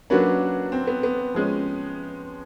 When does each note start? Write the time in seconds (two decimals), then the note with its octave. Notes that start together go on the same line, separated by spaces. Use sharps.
0.10 F#3 A#3 C#4 D4 F#4 B4
0.72 C4
0.87 B3
1.03 B3
1.34 F3 G#3 C#4